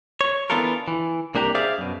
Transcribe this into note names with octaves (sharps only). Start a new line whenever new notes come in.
C#5
E3 B3 D4 F4 A4 A#4
E3
C2 A#3 D4 G4 A#5
G#4 C5 D5 E5 F5
F#2 B2